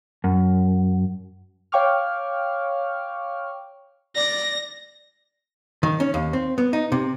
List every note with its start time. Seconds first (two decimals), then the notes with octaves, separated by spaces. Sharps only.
0.24 F#2
1.72 C#5 F5 G5 C#6 D6 F6
4.16 D5 A#6
5.83 D#3
6.00 C#4
6.14 D#2
6.33 C4
6.58 B3
6.73 D#4
6.92 C3